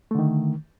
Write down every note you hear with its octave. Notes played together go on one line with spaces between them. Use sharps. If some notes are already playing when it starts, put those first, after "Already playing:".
D3 D#3 A3